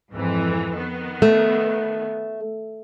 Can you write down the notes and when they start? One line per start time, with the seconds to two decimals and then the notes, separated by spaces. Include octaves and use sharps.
0.12 F2 G#2 E3
0.76 D#3 B3
1.22 A3